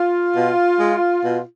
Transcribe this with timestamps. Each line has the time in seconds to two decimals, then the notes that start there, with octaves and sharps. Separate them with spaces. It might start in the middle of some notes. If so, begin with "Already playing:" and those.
Already playing: F4
0.36 B2
0.79 G#3
1.23 B2